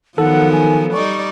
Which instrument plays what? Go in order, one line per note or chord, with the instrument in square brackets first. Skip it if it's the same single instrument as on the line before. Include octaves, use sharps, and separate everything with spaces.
[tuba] D#3 [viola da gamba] F3 F#3 B3 [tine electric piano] A4 [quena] F#5
[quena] G#5
[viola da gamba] G3 D#4 D5 [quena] C#6